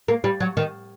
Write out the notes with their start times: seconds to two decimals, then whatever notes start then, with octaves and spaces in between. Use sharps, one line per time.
0.08 A#3
0.24 G3
0.40 F#3
0.57 D#3